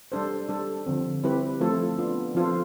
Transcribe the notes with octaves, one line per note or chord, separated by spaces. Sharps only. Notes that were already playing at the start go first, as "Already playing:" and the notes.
G3 D4 A4 C5
G3 D4 A4 C5
D3 F3 C4
G3 C4 E4 G4 B4
F3 A3 C4 F4 A4
B3 D4 F4
F3 C4 F4 A4 C5